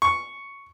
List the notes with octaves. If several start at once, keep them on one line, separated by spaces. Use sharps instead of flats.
C#6